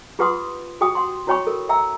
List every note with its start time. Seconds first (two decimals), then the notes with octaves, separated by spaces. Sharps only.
0.19 F4 G4 B4 F#5 C6 D#6
0.81 F#4 G4 G5 D#6
0.95 F#5 C6
1.27 E4 F#4 C#5 G5 B5 C#6
1.47 A4 A#4
1.69 E5 G5 A#5 E6